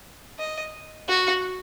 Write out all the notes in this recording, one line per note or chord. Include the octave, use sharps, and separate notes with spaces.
D#5
F#4